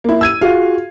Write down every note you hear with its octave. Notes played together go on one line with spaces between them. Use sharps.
A#3 E4
E6 G#6 D#7
F4 F#4 G#4 F5